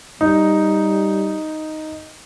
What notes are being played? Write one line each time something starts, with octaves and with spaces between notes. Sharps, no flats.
G3 D#4